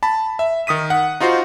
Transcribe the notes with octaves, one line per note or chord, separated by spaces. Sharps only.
A5 B5
E5
D#3 D#6 B6 D#7
F#5
D#4 F4 F#4 C5